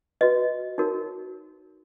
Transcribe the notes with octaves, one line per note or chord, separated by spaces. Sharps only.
F#4 B4 D#5
D#4 F#4 A#4 C#5